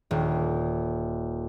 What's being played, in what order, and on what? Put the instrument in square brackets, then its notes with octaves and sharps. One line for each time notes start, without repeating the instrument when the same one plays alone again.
[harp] D#1